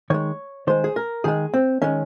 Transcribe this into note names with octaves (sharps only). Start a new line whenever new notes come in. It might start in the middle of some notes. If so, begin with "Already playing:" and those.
D#3 G#3 C#5
D#3 G#3 C5
G#4
A#4
D#3 G#3 G#4
C4
D#3 G#3 C#4